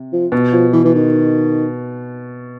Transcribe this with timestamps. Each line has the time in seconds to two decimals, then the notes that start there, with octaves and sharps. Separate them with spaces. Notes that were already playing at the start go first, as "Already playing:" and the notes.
Already playing: C3
0.13 F3
0.32 B2
0.52 F3
0.73 E3
0.85 E3
0.94 D#3